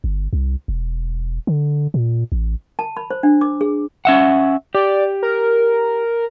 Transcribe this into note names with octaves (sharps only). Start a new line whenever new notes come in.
G1
C2
E1
D3
A#2
A1
A5
B5
C5
D4
D6
G#4
C#4 E5 F#5
G4 D5
A#4